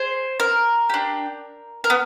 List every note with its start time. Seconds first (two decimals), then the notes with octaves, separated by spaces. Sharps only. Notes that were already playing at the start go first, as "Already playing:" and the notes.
Already playing: G#4 C5
0.40 A#4
0.90 D4 G4
1.84 A#4
1.90 B3